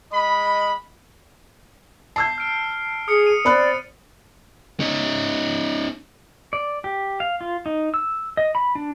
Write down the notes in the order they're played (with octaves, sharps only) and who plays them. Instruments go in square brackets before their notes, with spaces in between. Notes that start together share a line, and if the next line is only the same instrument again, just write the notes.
[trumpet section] G#3 D#5 B5
[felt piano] A5 E6 G6 [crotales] C7
[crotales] F6 D7
[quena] G#4 [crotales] D#6 C#7
[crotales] D#7
[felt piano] C4 B5 F#6 [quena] D5
[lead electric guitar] C#4 D#4
[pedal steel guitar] D5
G4
F5
F4
D#4
E6
D#5
B5
D4